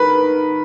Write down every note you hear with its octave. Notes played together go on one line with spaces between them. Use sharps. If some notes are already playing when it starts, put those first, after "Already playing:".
Already playing: D#3 B4